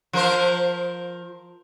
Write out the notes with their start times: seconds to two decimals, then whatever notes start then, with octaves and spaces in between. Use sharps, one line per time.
0.13 F3 A#4 C5